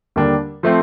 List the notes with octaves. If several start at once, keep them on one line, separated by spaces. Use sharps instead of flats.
D#2 D3 G3 A#3 D4
F3 A3 C4